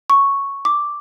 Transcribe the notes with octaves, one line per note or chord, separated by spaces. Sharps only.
C#6
D6